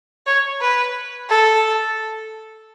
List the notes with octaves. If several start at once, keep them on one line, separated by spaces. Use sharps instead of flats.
C#5
B4
A4